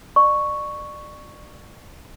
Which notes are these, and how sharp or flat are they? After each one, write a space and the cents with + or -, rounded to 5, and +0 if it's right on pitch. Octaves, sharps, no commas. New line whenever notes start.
D5 +30 C#6 +0